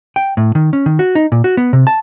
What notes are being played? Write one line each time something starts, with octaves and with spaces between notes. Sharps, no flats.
G5
A2
D#3
C#4
D#3
F#4
D#4
A#2
F#4
B3
C3
A5